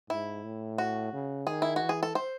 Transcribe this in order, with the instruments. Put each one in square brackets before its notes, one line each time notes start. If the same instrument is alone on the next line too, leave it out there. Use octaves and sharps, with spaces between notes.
[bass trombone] G#2 [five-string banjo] E4
[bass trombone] A2
[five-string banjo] F#4
[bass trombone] C#3
[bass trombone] D#3 [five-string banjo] G#4
[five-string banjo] E4
F#4
[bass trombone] E3
[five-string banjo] G#4
A4
C5